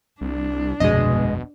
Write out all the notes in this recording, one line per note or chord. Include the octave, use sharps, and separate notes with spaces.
C2 D4
G1 C2 F2 B2 G#3 D#5